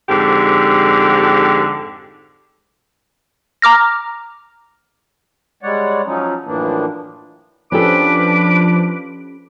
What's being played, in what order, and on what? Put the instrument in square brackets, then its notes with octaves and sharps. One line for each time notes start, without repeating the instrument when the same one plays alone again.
[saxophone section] F2 G#2 D3 G4
[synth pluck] A#5 D6 F6 A#6
[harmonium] G3 G#3 C#5 D5 F#5
F3 F#3 C#4 D#4
F#2 A2 E3 F3 A#3 D4
[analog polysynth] F3 [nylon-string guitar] C#4 G4 A4 [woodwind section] D4 B4 [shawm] D6